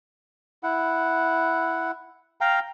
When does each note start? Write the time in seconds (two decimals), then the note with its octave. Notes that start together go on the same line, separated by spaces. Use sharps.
0.63 E4 F#5
2.41 F5 G5 A#5